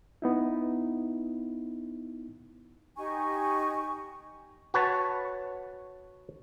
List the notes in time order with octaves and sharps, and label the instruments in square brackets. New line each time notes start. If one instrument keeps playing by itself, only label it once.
[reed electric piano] B3 D#4 E4
[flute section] D#4 G4 G#5 C#6
[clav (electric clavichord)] F#4 B4 C#5 A5